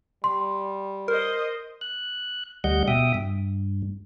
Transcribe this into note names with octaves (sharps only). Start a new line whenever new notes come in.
G3 C6
A#4 C5 D#5
F#6
D2 G3 D#5 F#5 G6
B2 E5 G5 D#6
G2